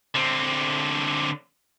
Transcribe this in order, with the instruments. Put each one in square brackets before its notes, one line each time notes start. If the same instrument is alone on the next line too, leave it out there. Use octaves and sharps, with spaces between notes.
[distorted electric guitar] D3 C4